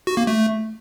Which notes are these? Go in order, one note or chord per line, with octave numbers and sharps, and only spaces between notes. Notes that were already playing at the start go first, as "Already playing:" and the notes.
F#4
A#3
A3